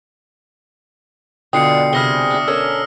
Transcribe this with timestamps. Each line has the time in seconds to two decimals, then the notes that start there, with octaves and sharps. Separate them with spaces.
1.53 B2 D3 D4 F4 G5 D#6 C7 C#7
1.93 C3 G3 G#4 F6 A#6 G7
2.30 D4 E5
2.48 C#4 A4 A#4 E6